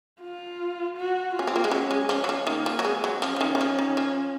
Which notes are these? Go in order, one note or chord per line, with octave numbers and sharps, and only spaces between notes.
F4
F#4
C#4 F4
C4
A#3
G#3
F#3 C#4
G#3
F3
F#3
F3
D#3 A#3
F3
F#3
G#3 C4
F#3
F3 C#4
F3
D#3
D#3
F3
D#3
F3